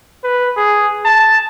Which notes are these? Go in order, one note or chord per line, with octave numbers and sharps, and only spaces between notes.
B4
G#4
A5